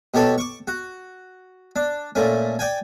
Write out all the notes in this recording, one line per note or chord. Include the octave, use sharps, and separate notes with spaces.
B2 G4 A4 C#5 A5
C#6 D6
F#4
D4
A#2 A3 C#4
D5 G5 G#5